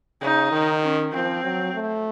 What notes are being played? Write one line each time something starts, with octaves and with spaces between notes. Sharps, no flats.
C#3 D#4
D#3
C#4
F3 C4
F#3
A3